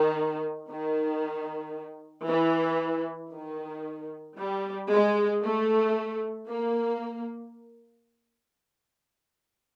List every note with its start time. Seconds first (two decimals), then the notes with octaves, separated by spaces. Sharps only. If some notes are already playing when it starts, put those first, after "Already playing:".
Already playing: D#3
0.70 D#3
2.27 E3
3.33 D#3
4.38 G3
4.91 G#3
5.43 A3
6.48 A#3